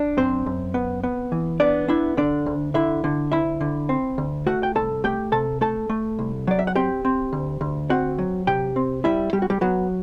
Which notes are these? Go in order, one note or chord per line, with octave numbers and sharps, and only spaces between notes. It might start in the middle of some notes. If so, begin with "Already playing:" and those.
Already playing: D4
F#2 C4 C5
F#2
B3
B3
E3
B3 D4 D5
D4 E4 E5
D3 D4 D5
D2
D3 E4 E5
D3
D2 E4 E5
D3
C4
D2
A3 F#4 F#5
G5
C2 A4 A5
A3 G4 G5
C3 A4 A5
A3 A4 A5
A3
C2
F#3 D5
E5
F#5
C4 G4 G5
C4
D2
D2
C4 F#4 F#5
F#3
C3 G4 G5
C4
G3 E4 E5
G3 G4
F#4
G3 G4
F#3 B3 F#4